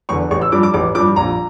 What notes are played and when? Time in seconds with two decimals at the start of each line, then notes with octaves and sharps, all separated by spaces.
0.09 E2 D3 C#6
0.31 A1 C#6
0.41 E6
0.52 G2 F3 D6
0.63 D6
0.74 A1 D6
0.95 F3 D6
0.98 G2
1.16 A#1 A#5